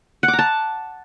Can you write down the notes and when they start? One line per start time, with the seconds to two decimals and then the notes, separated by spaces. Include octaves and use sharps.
0.23 F#5
0.28 D6
0.33 A#5
0.39 A5